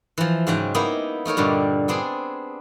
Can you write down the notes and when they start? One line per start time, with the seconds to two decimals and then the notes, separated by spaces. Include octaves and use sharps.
0.18 E3 F3
0.47 G#2 C#3 F#3 F#5 G5 A#5
0.75 A#3 B3 D#4 E4
1.26 A3 D#4 A#4 C#5
1.37 G2 A#2 D3 G3
1.88 B3 C4 D4 G#4